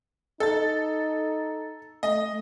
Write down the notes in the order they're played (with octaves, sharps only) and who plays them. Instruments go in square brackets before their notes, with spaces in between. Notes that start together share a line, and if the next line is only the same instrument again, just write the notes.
[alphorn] D#4 [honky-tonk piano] A4 A6
[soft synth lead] A3 [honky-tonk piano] D#5